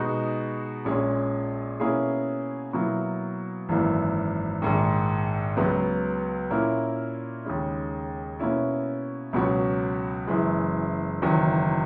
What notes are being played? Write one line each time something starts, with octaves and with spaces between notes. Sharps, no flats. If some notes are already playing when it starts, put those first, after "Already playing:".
Already playing: B2 G#3 D#4 F#4
A#1 A#2 G#3 C#4
B2 A#3 C#4 E4 G#4
B2 F#3 A#3 E4
G#1 F#2 E3 A#3
A#1 G#2 D#3
C#2 C#3 F#3 B3
A#2 A#3 C#4 E4 A#4
D#2 C#3 G#3 C#4
B2 A#3 C#4 E4
C#2 B2 F#3 C#4 F#4
F#1 F#2 E3 G#3
F#1 E2 D#3 F#3